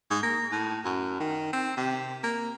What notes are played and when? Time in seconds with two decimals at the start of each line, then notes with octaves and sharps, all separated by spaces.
0.11 G#2
0.23 A#3
0.52 A2
0.85 F#2
1.20 D#3
1.53 C4
1.77 C3
2.23 A#3